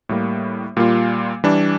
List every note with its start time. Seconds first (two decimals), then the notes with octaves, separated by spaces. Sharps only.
0.09 A2 G3 A#3
0.77 A#2 G3 A#3 F4
1.44 E3 G3 D4